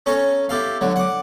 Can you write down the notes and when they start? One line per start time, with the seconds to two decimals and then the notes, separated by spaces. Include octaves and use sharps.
0.06 C#4 A4 C#5 A#5
0.49 E4 G4 A4 F5
0.81 D3 F#3
0.96 F#5 D6